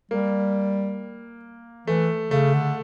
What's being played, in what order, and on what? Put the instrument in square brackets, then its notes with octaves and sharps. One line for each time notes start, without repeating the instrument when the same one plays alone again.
[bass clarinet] G3 [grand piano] A#3
[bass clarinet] E3 [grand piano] A3
[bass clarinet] C#3 [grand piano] A3
[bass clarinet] D3